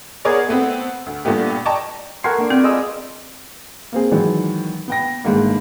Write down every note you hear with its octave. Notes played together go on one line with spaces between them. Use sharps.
B3 G#4 A#4 C#5 D5
A3 B3 C4
D2
G2 A#2 A3 B3 G4
D5 D#5 G5 A5 A#5 C#6
A3 B3 A#4 F#5 G#5 C6
A#3 D4
B3 C4 F4 D5
G#3 D#5 E6
A#3 C4 G#4
D#3 E3 F#3 G#3
B3 G5 A#6
G1 G#2 D#3 A#3